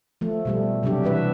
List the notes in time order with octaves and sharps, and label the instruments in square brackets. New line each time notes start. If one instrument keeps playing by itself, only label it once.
[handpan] F3 A3
B2 G3 A3
C3 F#3 G3 D4 G4
E3 G3 B4 E5